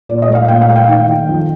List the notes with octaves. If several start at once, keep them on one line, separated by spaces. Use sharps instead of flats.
A#2 D5
D#5
A3
F5
A#2 G5
F5
A3
G5
F5
D#3 G5
D#3
F2